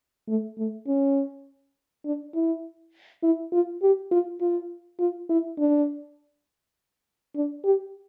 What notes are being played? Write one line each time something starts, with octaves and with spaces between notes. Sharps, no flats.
A3
A3
C#4
D4
E4
E4
F4
G4
F4
F4
F4
E4
D4
D4
G4